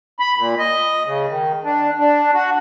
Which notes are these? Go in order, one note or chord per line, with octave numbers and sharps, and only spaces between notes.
B5
A#2
D#5
C#3
D#3
D4
D4
F#4